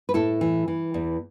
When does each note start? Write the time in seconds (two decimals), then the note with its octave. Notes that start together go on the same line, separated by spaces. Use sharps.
0.09 B4
0.14 A2 E4 A4
0.41 E3
0.68 E3
0.94 E2